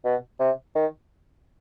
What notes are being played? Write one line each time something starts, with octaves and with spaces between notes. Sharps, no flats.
B2
C3
D#3